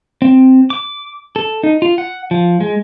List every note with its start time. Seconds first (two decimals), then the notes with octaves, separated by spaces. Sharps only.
0.22 C4
0.70 D6
1.36 A4
1.63 D#4
1.82 F4
1.98 F#5
2.31 F3
2.60 G#3